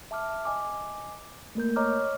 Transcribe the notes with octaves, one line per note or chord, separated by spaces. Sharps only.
E5 A5 D6 F6
D#5 G#5 D6
A3 A#3 A#4 G6
C#5 D#5 A#5 D6 F6